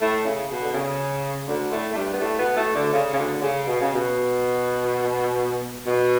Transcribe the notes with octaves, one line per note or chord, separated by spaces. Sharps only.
A2 A3
C#3
B2
D3
C#3
D2 D3
A2 A3
A3
G2 G3
B3
A2 A3
B2 B3
A2 A3
D2 D3
C#3
C#3
D2 D3
C#3
B2
C#3
B2
B2